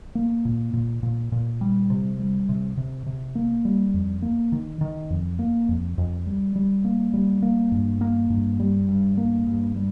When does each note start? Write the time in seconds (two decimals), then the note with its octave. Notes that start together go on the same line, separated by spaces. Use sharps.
0.15 A#3
0.45 A#2
0.73 A#2
1.03 A#2
1.32 A#2
1.61 G3
1.90 C3
2.19 G3
2.49 C3
2.77 C3
3.06 C3
3.35 A#3
3.65 G3
3.94 F2
4.22 A#3
4.52 D#3
4.81 D#3
5.10 F2
5.39 A#3
5.69 F2
5.98 F2
6.26 G3
6.56 G3
6.85 A#3
7.14 G3
7.42 A#3
7.72 G2
8.01 A#3
8.30 G2
8.60 G3
8.89 G2
9.17 A#3
9.47 G2
9.76 G3